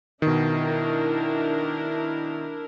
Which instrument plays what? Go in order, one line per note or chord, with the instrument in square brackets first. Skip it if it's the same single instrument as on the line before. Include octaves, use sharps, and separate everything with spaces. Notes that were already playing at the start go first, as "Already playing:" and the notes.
[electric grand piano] B2 D#3 [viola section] D4 E4 A#4